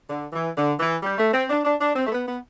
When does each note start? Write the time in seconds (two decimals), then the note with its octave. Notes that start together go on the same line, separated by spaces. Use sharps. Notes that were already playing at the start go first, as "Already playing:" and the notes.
0.10 D3
0.33 E3
0.57 D3
0.80 E3
1.03 G3
1.18 A3
1.34 C4
1.50 D4
1.65 D4
1.81 D4
1.95 C4
2.07 A3
2.12 B3
2.27 B3